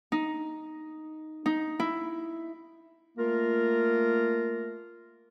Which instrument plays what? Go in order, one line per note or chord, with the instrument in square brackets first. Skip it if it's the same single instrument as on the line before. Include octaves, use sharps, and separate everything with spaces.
[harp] D#4
D#4
E4
[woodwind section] A3 A#3 F4 A#4